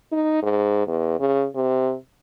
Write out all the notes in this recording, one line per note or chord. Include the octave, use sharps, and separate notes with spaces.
D#4
G#2
E2
C#3
C3